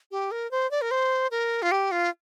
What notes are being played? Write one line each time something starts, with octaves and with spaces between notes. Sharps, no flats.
G4
A#4
C5
D5
A#4
C5
A#4
F4
G4
F4